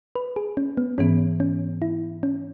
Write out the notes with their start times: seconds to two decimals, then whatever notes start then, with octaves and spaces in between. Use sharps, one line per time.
0.15 B4
0.36 G#4
0.57 C#4
0.77 B3
0.98 G#2 E3 B3 C#4
1.40 C#4
1.82 E4
2.23 C#4